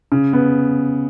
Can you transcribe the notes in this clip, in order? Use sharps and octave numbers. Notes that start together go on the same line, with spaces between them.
C#3
B3